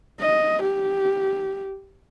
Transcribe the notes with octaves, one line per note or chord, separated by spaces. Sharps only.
D#5
G4